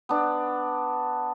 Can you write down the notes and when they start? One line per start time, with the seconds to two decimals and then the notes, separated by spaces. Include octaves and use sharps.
0.09 B3 D4